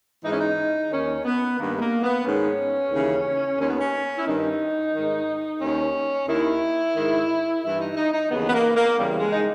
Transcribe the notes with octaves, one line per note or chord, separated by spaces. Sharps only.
G#2 E3 D#4
C#4
D#4
D#2 D#3 C#4
B3
G2 D#3 A#3
G#3
A#3
B3
G#2 D#3 C#4
D#2 C#3 E3
D#2 D#3 C#4
B3
C#4
E4
G2 D#3 D#4
G#2 D#3
D#2 D#3 C#4
D#2 D#3 E4
G#2 D#3
G2 E3 E4
D#4
D#4
D#4
D#2 C#3 E3 B3
B3
A#3
A#3
E2 C#3 E3 G3
G#3
D#4